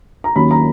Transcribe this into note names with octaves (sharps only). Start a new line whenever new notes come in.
A#5
D#2 D#3 F#3 A#3 C#4 B5
A#5